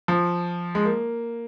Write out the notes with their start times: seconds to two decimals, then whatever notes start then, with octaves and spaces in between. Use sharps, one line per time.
0.08 F3
0.75 G#3
0.85 A#3